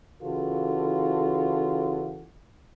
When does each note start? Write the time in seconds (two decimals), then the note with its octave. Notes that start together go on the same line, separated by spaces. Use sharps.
0.22 C#3 E3 F4 F#4 A4